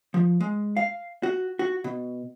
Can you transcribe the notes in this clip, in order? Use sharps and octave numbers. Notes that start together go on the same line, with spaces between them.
F3
G#3
F5
F#4
F#4
B2